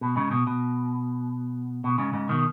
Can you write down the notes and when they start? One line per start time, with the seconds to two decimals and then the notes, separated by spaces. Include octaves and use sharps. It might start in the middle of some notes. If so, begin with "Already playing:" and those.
0.01 B2
0.16 G#2 C#3
0.31 B2
0.47 B2
1.84 B2
1.98 G#2 C#3
2.13 G#2 C#3
2.29 B2 D#3